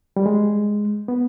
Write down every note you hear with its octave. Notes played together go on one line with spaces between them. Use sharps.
G3
G#3
B3